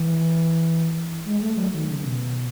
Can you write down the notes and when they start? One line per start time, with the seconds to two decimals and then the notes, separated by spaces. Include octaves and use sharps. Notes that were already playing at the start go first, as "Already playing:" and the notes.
Already playing: E3
1.25 G#3
1.41 A3
1.56 F#3
1.73 D#3
1.88 C#3
2.04 B2